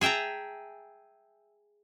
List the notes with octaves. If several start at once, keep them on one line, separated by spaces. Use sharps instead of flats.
G#4 E5 G5 A5 A#5